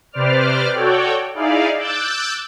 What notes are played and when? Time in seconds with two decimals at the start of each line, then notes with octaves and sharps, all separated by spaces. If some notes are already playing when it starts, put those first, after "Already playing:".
0.12 C3 B4 C5 D5 D6 F6
0.74 F#4 A4 C#5 D5 G5
1.34 D#4 E4 G#4 D5 F5
1.78 D6 E6 F#6 G6 A6